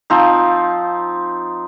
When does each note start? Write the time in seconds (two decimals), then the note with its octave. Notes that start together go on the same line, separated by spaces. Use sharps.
0.10 F3 C4 D#4